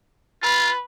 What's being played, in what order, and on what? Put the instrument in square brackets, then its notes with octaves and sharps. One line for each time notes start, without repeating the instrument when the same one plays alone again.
[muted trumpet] F4 [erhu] B4